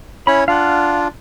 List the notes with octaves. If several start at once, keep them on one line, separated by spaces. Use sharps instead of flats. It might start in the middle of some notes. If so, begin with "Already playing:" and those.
C#4 E4 C#5 B5
D4 F4 F5 F#5